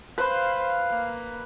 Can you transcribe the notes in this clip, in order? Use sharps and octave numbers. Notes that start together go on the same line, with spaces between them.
B4 C5 F5
A#3